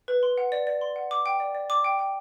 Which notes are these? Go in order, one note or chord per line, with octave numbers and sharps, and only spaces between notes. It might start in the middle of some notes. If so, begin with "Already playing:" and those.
B4
C6
F#5
D5
D5
C6
F#5
D6
G5
D5
D5
D6
G5
G5